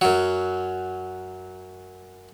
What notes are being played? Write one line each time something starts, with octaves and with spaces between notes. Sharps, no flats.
F#2 F#3